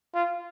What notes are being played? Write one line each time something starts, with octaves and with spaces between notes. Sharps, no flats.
F4